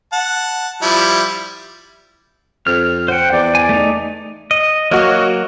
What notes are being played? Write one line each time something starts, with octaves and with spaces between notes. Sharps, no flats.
F#5 A5
F3 G3 E4
F2 F6
C5 F#5 G5
E2 D5
G#5
A3 D#4
D#5
F#3 A#3 F#4 D#5